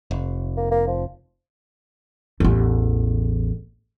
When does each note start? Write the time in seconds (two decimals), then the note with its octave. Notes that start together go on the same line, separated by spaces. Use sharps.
0.11 F1
0.57 A#3
0.71 A#3
0.87 F3
2.40 A1 E2